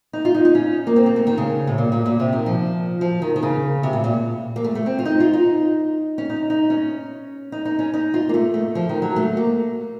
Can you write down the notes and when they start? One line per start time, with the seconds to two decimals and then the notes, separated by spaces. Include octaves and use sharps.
0.13 D#4
0.25 F4
0.35 D#4
0.45 D#4
0.55 C#4
0.87 A#3
0.96 C4
1.06 A#3
1.16 A3
1.27 D#3
1.38 C#3
1.67 A2
1.78 A#2
1.92 A#2
2.06 A#2
2.20 C3
2.33 D#3
2.46 F3
3.01 F3
3.22 D#3
3.36 D#3
3.43 C#3
3.83 C3
3.93 A2
4.04 A#2
4.56 A#3
4.64 A3
4.75 A3
4.86 C4
4.99 F4
5.05 D#4
5.20 F4
5.33 D#4
6.18 C#4
6.30 D#4
6.50 D#4
6.70 C#4
7.52 D#4
7.65 D#4
7.79 C#4
7.94 D#4
8.14 F4
8.29 A#3
8.34 A3
8.54 A3
8.75 F3
8.89 D#3
9.02 F#3
9.16 A3
9.37 A#3